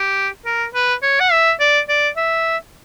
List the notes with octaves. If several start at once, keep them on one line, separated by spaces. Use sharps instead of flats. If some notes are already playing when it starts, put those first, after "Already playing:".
Already playing: G4
A#4
B4
C#5
F#5
E5
D5
D5
E5